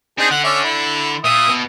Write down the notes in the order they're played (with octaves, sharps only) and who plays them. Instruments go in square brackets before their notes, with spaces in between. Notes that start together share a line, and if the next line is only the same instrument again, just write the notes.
[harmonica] C4 D#4 G#4 [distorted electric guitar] D4
[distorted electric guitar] D3 [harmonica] F#5
[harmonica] C#4 D5 E5
E4
[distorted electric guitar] A#2 [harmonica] E5 D#6
[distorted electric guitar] B2